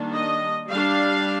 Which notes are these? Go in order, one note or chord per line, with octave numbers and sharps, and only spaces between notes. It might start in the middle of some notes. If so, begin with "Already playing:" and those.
Already playing: D#3 G3 A#3 D4
D#5
G3 D4 F5